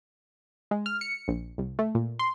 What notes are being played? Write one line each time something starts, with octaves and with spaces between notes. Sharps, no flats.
G#3
F6
C#7
A#1
C2
A3
A#2
C6